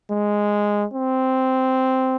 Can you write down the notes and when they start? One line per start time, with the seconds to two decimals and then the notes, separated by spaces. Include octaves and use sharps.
0.11 G#3
0.94 C4